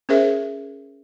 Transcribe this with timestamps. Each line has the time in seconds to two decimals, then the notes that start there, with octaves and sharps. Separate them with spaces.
0.09 C#4 G#4 A#4 C5 E5